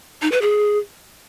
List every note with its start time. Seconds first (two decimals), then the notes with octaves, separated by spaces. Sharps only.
0.22 D#4
0.32 B4
0.41 G#4